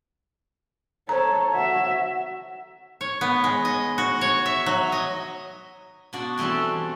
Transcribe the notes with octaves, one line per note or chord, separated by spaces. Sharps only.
A4 C5 C#5 A#5
F#4 E5
C#5
B3
G#3
D#5
F#4
C#5
E5
F#3
D#5
B2 D4 F#4 D5
E3 G3 A3 C4 D4